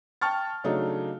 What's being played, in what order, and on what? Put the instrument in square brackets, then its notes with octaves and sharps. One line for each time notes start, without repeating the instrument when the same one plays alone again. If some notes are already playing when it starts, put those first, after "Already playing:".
[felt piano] G5 A5 C#6 F6 A6
C#3 F#3 A3 D4 D#4